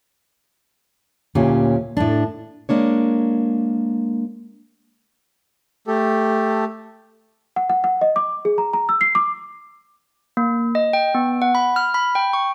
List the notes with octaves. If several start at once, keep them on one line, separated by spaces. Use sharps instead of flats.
D2 A#2 C#4 G4
A2 D4
G#3 A#3 D4 C#5
A3 G4 A4
F#5
F#5
F#5
D#5
D6
G#4
A#5
A#5
E6
C7
D6
A#3
D#5
G5
B3
F#5
B5
F6
B5
G5
C#6